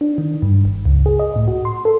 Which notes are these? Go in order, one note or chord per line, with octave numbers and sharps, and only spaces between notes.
D4
D#3
G2
G1
C#2
G#4
D#5
A2
F#4
C6
A4